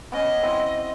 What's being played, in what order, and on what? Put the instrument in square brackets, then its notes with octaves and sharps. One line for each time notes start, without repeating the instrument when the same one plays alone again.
[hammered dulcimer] B3 C#4 D6 [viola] D#5
[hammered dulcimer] C4 E4 C5